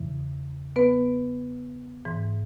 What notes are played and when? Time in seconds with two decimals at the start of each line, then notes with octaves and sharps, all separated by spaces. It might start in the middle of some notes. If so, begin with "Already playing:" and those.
Already playing: E2 C#3 E3
0.76 B3 B4
2.05 G#2 E3